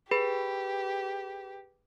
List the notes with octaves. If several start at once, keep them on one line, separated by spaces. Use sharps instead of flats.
G4 G#4 B4 B5